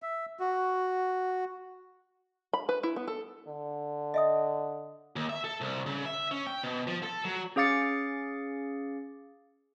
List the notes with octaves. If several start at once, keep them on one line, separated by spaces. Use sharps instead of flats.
E5
F#4
B5
B4
E4
B3
A4
D3
D#5 E5 D#6
D#2
E5
A4
C2
C#3
E5
C#4
G5
B2
F3
A4
F#3
C#4 G#4 F5 D6 A6 C#7